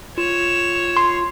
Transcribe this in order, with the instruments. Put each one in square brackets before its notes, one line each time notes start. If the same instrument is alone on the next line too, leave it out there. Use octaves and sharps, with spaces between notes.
[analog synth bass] F4 [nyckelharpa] C#5 [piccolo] E7
[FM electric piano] C6